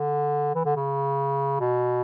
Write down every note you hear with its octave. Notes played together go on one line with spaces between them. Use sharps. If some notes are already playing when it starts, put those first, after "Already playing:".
Already playing: D3
E3
D3
C#3
B2